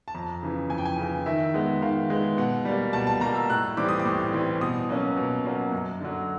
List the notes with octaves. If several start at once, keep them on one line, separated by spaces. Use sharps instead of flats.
A5
F2 A#5
C#3 E3
F2 G#5
G5
G#5
C#3 E3
D#3 E5
G#3 B3
D#3 F5
G#3 B3
B2 F#5
G3 A#3
B2 A5
A5
G3 A#3 A#5
E6
A2 F#6
E3 G3 C4 D6
D#6
D6
A2
E3 G3 C4
B2 D#6
F#3 A#3 C#4
B2
F#3 A#3 C#4
F#2
D3 F#3